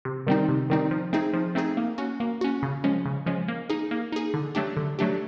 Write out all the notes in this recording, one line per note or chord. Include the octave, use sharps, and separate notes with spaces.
C3
D#3 G3 C4 D#4
C3
D#3 G3 C4 D#4
F3
A3 C4 D#4 G#4
F3
A3 C4 D#4 G#4
A#3
C#4 F#4
A#3
C#4 F#4
C#3
F3 G#3 C#4
C#3
F3 G#3 C#4
A#3
D#4 G#4
A#3
D#4 G#4
D3
F#3 A3 D4 G4
D3
F#3 A3 D4 G4